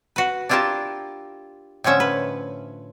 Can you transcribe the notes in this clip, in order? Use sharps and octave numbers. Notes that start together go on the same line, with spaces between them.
F#4 B4
D4 E4 F4 G4 A#4 A5
A2 D3 F3 C#4 E5
B4